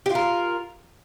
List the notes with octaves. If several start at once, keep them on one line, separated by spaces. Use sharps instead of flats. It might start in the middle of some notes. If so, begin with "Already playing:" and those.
F4 G4 A#4